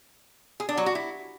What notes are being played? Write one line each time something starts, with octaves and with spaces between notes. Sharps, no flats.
G#4
D4
F#3
F#4
E4